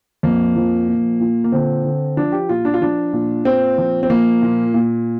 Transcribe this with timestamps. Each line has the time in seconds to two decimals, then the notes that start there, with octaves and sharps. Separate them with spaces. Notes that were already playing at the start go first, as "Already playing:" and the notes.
0.23 F2 A#3
0.56 F3
0.88 A#2
1.20 A#2
1.44 A#3
1.52 D3 C4
1.84 D3
2.17 F3 D4
2.32 G4
2.49 A#2 F4
2.65 D4
2.74 F4
2.81 F3 D4
3.13 A#2
3.45 A#2 C4
3.78 F3
4.03 C4
4.10 F3 A#3
4.42 A#2
4.74 A#2